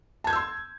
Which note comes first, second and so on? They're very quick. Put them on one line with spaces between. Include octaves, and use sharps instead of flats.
A5 G#6 G6 E6 C6